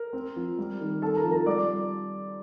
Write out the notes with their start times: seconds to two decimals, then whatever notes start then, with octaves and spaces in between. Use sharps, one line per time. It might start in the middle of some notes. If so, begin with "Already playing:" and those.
Already playing: A#4
0.13 C4
0.36 F3
0.58 G3
0.80 D#3
1.02 C4 A4 A5
1.16 A#4 A#5
1.24 F3
1.31 A#4 A#5
1.46 G3 D5 D6